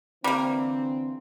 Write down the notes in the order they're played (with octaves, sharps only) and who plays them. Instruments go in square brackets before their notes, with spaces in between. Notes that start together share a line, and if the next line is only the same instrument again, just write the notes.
[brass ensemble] D3 E3 C4 [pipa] G3 A#3